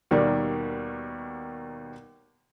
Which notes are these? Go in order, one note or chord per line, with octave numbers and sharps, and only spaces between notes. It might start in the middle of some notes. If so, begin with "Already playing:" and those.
D#2 B2 D#3 G3 A#3